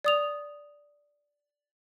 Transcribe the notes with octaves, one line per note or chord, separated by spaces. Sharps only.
D5 D#6 F7